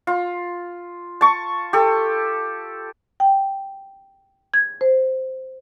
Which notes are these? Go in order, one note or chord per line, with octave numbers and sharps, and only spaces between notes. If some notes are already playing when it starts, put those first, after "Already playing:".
F4
A5 C#6
G4 A4
G5
G#6
C5